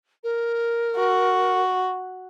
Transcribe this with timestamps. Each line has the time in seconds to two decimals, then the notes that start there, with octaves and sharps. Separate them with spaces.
0.24 A#4
0.98 F#4